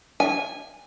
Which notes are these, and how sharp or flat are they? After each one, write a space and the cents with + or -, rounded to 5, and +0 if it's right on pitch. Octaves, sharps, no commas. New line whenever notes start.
G#5 -15